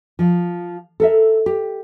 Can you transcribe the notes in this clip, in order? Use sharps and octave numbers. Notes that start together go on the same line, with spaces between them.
F3
A4 A#4 E5
G4